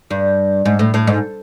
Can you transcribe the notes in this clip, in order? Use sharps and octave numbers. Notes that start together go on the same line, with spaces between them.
G2
G#2
A2
A2
G#2